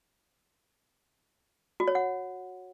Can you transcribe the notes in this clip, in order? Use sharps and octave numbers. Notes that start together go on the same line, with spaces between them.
F#4
C#5
F#5